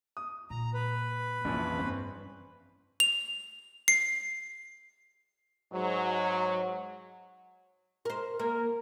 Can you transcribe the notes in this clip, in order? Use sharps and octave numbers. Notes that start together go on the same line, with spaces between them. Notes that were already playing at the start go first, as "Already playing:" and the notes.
D#6
A#2 A#5
B4
A#1 F2 E3 C#4
G2 C4 C#4 C5
F7
C7
G#2 F#3
A#4 C5
A#3 A#4